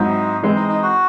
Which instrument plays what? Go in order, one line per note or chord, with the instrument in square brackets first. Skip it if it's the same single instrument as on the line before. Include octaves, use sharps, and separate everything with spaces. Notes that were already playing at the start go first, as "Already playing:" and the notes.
Already playing: [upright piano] G#2 F#3 C4 E4 C5 [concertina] D#4
[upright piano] E3 G#3 C4
[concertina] D#4
D#4
F#4